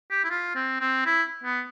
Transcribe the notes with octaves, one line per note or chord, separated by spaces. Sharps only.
G4
E4
F4
C4
C4
E4
B3